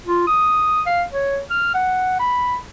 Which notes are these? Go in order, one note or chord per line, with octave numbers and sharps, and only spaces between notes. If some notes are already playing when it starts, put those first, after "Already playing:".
F4
D#6
F5
C#5
F6
F#5
B5